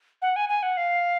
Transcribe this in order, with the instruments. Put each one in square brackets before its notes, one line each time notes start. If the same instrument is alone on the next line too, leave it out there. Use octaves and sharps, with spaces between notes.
[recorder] F#5
G#5
G#5
F#5
F5